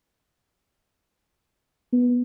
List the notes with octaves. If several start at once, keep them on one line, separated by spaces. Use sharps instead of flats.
B3